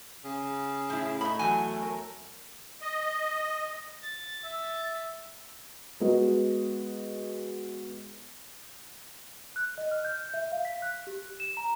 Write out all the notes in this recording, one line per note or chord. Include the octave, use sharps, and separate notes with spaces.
C#3
A2 E4
A3 D#4 B5
E2 F#3 F#4 G#5
A#4
D#5
A6
E5
G#3 B3 F#4 B4 D#5
F#6
D#5
F6
G6
E5
F5
B6
F#6
G4
E7
A#5